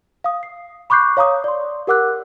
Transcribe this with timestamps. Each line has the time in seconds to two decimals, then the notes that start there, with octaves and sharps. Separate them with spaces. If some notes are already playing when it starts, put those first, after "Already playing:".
0.24 F5 D#6
0.43 C7
0.90 B5 C#6 D6 F#6 G6 C7
1.17 C#5 F5 A#5 D6 D#6
1.44 D5 C6
1.87 G4 A#4 F#5 D6 E6 F#6